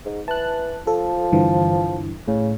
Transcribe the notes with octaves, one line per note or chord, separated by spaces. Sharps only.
G#2
E3 A5 F#6
F3 A4
G2 D3 E3
A2 C#3